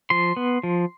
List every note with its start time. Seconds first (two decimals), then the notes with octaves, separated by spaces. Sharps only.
0.10 F3 C6
0.37 B3
0.63 F3